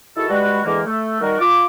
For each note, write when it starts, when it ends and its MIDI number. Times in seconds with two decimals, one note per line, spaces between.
0.17 0.25 51
0.17 0.25 64
0.17 0.25 66
0.17 0.25 68
0.17 0.25 69
0.30 0.60 55
0.30 0.60 56
0.30 0.60 66
0.30 0.60 71
0.64 0.81 40
0.64 0.81 50
0.64 0.81 52
0.64 0.81 56
0.64 0.81 58
0.86 1.21 57
1.21 1.38 51
1.21 1.38 55
1.21 1.38 66
1.21 1.38 70
1.39 1.66 65
1.39 1.66 86